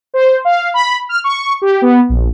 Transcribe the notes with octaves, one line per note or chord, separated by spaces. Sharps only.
C5
F5
B5
F6
C#6
G4
B3
A#1